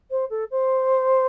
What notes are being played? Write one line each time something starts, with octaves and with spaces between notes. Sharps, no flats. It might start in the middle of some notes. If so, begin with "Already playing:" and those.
C5
A4
C5